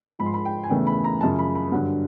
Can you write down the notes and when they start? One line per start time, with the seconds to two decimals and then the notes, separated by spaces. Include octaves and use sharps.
0.19 G#2 F3 G#3 B5
0.26 C6
0.34 B5
0.45 G5
0.64 G#5
0.70 E2 C#3 E3 A3 G5
0.87 B5
1.04 A#5
1.21 F#2 C#3 F3 A5
1.39 B5
1.55 B5
1.72 G2 D3 F#3 F#5